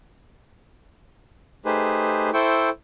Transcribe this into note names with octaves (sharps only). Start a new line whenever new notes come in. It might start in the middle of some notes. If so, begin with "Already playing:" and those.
A3 D#4 G4 G#4 B4 C5
E4 A4 C5 G5 C#6